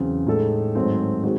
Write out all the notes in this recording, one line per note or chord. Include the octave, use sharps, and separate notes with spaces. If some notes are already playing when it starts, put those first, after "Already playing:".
Already playing: E2 C#3 F#3 C4
A2 G#3 D#4 A4
G#2 D#3 F#3 A3 C4
D#3 G#3 C4 F#4